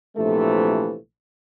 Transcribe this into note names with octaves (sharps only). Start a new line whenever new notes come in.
A#1 C3 E3 F3 A3